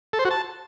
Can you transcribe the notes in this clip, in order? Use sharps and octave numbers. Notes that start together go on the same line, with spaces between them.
A4
C5
F#4
A5